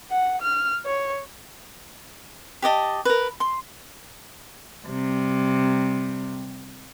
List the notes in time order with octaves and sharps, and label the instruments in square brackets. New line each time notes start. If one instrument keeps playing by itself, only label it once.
[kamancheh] F#5
F6
C#5
[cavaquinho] G4 D5 D#5 A5
A#4 B4
C6
[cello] C3 G3